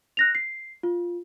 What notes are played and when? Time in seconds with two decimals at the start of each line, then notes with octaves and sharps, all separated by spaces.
0.17 F#6 A#6 F7
0.35 C7
0.83 F4